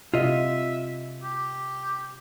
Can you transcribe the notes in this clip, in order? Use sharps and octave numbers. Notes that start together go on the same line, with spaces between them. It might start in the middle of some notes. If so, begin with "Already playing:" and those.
C3 F4 D#5 E5
G4